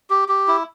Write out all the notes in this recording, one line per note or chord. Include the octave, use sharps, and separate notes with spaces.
G4
G4
E4